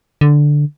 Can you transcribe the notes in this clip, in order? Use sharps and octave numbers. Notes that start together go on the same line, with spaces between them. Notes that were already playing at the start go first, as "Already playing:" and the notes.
D3